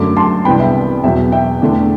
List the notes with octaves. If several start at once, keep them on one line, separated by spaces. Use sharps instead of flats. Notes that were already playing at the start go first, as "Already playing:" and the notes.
Already playing: F#2 D3 A3 D6
A5 C6
C2 C3 E3 B3 D4 G5 B5
E5 G5
E2 B2 F#3 E5 G5
E5 G5
E2 D3 A3 D4